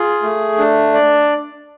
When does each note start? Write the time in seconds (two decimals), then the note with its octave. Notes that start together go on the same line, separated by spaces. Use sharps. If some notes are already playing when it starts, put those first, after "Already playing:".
Already playing: F4 G#4
0.23 A3
0.58 D4
0.94 D5